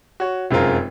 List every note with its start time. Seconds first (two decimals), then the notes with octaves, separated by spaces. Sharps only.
0.20 F#4 C#5
0.51 F1 F#2 G#3 C4 F4 A#4